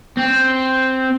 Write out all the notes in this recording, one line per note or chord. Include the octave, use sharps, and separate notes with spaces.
C4